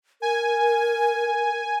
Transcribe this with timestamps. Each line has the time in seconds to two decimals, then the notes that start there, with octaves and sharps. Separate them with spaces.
0.22 A#4 G#5